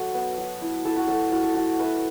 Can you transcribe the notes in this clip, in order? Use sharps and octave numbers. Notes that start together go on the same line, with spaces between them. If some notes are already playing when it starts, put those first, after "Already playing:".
Already playing: F#3 F#4 A4
B3
F#3
E4
E4 A4
F#4
F#3 A4
E4 F#4
A4
F#3 F#4
A3 B4 E5